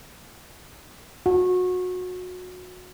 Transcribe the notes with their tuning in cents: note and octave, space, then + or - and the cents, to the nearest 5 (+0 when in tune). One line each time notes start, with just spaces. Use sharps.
F#4 -25